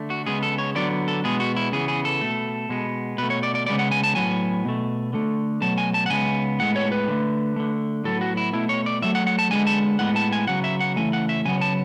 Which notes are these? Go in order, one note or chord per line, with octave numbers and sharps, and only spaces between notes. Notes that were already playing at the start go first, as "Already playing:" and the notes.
Already playing: D3 A3
F#4
C#3 G#3 B3 G#4
A4
C#5
D3 F#3 B3 D5
A4
B2 G#3 B3 G#4
F#4
E4
C#3 E3 B3 G#4
G#4
A4
B2 A3
B2 G#3 B3
B2 A3 B4
C#5
D5
D5
C#3 G#3 B3 D5
F#5
G#5
A5
A2 F#3 B3 G#5
B2 A3
D3 A3
B2 F#3 A3 A5
G#5
A5
F#5
C#3 G#3 B3 G#5
A2 G#3 B3 F#5
C#5
B4
D3 A3
D3 A3
A2 F#3 B3 A4
F#4
E4
B2 A3 E4
C#5
D5
A2 F#3 A3 E5
F#5
F#5
A5
D3 G#3 B3 G#5
A5
A2 G#3 B3 F#5
A5
G#5
C#3 F#3 B3 F#5
E5
F#5
C#3 E3 A3 G#5
F#5
E5
C#3 F#3 B3 G#5
A5